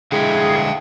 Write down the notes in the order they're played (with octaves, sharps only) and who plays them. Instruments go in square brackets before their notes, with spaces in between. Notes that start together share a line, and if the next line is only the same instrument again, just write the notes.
[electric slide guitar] D3 G#3 E4 [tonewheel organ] G#4 [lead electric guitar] F5 G5